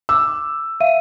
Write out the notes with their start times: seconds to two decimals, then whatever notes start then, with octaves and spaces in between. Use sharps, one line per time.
0.09 D6 E6
0.80 E5 F5 D#7